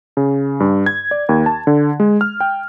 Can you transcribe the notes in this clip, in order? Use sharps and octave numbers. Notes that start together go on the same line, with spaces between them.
C#3
G2
G#6
D5
D#2
A5
D3
G#3
F6
G5